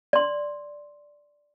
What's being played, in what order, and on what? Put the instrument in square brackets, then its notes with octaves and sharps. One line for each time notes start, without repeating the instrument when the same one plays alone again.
[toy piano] D5 C6